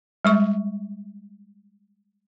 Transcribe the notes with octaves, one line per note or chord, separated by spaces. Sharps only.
G3 G#3 C#6